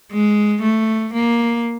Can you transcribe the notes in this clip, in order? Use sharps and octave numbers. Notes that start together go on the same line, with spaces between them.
G#3
A3
A#3